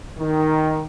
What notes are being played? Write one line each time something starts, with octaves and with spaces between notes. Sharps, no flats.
D#3